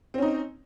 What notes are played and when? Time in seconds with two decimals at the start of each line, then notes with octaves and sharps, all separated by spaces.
0.14 C4
0.18 C#4
0.22 D#4